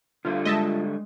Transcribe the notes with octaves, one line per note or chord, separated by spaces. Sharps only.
D3 G3 A3 F4
G#3 D#5 E5 A5